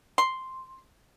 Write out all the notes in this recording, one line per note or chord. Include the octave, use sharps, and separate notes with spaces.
C6